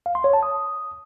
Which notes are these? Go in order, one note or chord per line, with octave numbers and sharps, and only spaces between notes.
F5
C6
C#5
A5
D#6